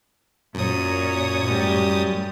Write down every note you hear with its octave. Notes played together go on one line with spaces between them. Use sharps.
F#2 A#2 C#5 D#6
A2 G3